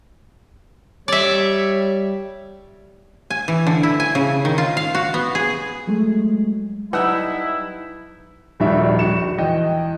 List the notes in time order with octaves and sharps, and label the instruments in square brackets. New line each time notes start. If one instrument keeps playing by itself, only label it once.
[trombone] G3 [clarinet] C#5 [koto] D5 E5
[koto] G#5
E3
D3
E4
G#5
C#3
D#3
F4
F5
F#4
B3
G#4
[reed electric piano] F#3 G#3 A3
[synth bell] F#3 [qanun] G3 D#4 E5 [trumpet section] E4 [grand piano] F#5 E6 F#6
[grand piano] D#1 A#1 D#3 G3 F#4 E5
A#1 F#4 C#7 E7
E2 D#5 G5